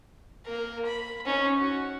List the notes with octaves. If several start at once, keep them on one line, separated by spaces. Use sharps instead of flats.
A#3 A#4
B5
C#4 D#4
F#4